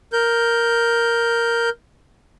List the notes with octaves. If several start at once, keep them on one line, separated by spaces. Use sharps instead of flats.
A#4 G6